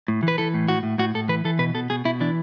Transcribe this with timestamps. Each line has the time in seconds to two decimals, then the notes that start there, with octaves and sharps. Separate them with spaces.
0.08 A2
0.23 E3
0.28 B4
0.38 E3 A4
0.54 A2
0.68 A2 F#4
0.83 A2
0.98 A2 F#4
1.14 A2 A4
1.29 E3 B4
1.45 E3 A4
1.59 B2 B4
1.74 B2 A4
1.90 B2 G#4
2.05 B2 E4
2.20 E3 D4